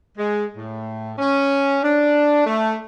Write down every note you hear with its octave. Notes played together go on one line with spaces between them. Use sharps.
G#3
A2
C#4
D4
A3